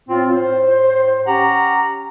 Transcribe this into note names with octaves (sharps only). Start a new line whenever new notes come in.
A2 C4 F4
A2 C5
C#4 G4 F#5 A#5